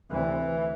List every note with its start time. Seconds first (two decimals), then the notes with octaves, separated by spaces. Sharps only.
0.11 D2 C3 E3